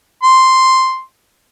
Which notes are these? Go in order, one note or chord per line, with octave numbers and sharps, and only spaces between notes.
C6